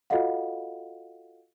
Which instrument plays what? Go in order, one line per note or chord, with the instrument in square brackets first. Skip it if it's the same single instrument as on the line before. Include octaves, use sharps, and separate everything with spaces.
[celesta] F4 F#4 A4 D#5 F5 F#5